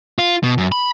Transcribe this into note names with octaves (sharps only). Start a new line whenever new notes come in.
F4
B2
F#2
B5